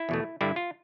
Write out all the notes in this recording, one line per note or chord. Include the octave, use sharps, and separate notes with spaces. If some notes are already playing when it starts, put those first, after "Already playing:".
Already playing: E4
E2 B2 A3
G2 D3 G3 E4
F4